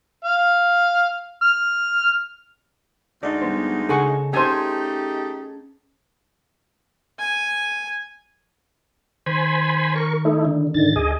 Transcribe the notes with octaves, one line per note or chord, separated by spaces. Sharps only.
F5
F6
D2 G#3 D#4 D5
G3 B3 C5
C#3 G#4 A4 F#5 C#6
A3 C#4 D#4 G4 G#4 C5 G#5 A5
G#5
D#3 C5 G#5 B5
A#4 C#6
A3 D#4 E4
D3
G#2 D3 D#3 A6
D2 G#4 D#5